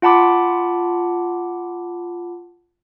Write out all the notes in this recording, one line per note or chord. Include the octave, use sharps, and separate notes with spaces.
F4 F#5 A5 B5 D6